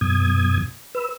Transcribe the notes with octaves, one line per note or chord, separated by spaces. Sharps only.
F#2 B2 D#6 G#6
B4 E6